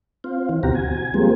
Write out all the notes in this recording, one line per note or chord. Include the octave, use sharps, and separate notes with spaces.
C4 F4
E3
D2 B2 C4 F#4 G4 A#5
G#5
F3 G3 G#3 A#3 C4